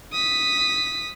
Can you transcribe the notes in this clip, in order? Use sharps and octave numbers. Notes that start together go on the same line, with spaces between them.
D#6 B6